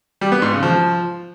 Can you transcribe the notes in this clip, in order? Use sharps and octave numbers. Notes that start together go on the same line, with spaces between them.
G3
B3
G#2
C#3
F3